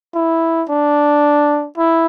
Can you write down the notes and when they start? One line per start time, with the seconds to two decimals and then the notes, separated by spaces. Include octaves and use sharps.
0.15 E4
0.69 D4
1.78 E4